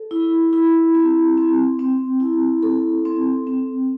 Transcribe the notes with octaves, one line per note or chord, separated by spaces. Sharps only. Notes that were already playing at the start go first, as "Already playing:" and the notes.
Already playing: A4
E4
E4
C4
C4
C4
E4
A4
C4
C4